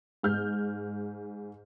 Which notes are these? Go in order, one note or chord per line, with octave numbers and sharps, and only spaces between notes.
G#2 F6 G6